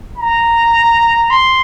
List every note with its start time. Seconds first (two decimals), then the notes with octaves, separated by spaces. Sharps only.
0.18 A#5
1.31 C6